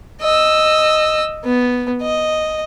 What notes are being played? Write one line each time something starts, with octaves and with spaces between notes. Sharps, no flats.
D#5 E6
B3
D#5